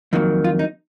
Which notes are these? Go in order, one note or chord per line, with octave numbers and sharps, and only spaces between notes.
F2 D#3 F#3 A#3
F4
D#4